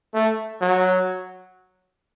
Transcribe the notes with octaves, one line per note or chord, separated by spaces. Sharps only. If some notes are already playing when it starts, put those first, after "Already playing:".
A3
F#3